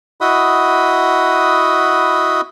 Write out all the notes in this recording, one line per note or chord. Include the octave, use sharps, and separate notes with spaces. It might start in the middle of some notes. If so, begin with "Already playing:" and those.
E4 F#4 D#5 F#5 B5 D#6